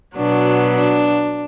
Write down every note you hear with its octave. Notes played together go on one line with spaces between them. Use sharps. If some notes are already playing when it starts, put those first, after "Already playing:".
B2 F#3 B3 D4
D4